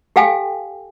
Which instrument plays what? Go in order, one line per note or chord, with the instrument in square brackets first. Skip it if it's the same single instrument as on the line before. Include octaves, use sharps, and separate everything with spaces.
[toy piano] G4 A4 F5 G5 G#5